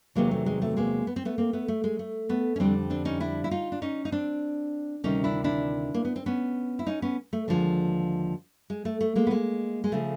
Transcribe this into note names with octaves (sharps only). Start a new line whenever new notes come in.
E2 C3 D#3 F#3 G#3 A#3
A3
G#3
A3
G#3 A#3
B3
C4
A3 B3
A#3 C4
A3 B3
A3
G#3
A3
A3 B3
C#4
F2 D3 G3 C4 D4
C4 D4
C#4 D#4
D4 E4
E4
D#4 F4
D4
C#4 D#4
D#4
C4 D4
D2 C3 D#3 G3 C#4 D#4
D4 E4
D4 E4
A#3
B3
C4
B3 C#4
E4
C#4 D#4
B3 C#4
A3
D#2 D3 F3 G#3 A3
G#3
A3
A3
G#3 A#3
B3
G#3 A#3
G#3
C#3 F3 A3